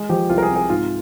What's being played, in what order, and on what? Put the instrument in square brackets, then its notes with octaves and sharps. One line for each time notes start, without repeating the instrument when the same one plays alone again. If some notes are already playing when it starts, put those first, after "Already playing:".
Already playing: [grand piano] G#3
F3 G4
C2 F4
A#4
G#4
C3
G#4
G#2 F4